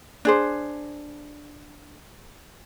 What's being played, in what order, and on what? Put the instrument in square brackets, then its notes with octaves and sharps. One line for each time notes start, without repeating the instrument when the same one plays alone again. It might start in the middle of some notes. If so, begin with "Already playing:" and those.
[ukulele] D4 G#4 C5